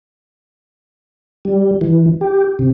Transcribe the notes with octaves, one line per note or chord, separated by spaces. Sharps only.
G3
E3
G4
C3